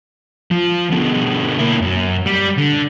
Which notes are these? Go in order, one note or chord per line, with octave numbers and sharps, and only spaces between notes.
F3
B2 D3
A#3 E4
F#2
G3
D3